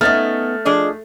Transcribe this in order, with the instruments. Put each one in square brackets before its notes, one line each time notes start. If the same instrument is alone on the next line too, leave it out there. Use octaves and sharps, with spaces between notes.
[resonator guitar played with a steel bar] A3 [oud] B3 C#4 D#4 [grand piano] F6 A6
[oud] F3 G#4 D#5 [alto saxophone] D4